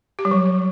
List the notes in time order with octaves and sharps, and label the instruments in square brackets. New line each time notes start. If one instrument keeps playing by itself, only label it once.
[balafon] G4
G3
F#3